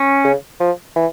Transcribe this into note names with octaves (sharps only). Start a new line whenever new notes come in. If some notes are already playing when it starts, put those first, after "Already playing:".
Already playing: C#4
C#3
F3
E3